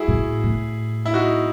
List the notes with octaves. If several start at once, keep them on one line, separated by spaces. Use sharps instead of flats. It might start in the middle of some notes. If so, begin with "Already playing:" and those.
Already playing: E4 F#4 G#4
A2
A2
E4
D#4 F#4